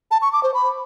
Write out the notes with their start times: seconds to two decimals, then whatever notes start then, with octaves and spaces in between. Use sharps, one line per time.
0.11 A5
0.22 C#6
0.33 D6
0.43 C5
0.54 B5